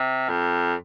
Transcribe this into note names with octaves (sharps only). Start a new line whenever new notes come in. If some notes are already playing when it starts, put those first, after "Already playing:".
Already playing: C3
F2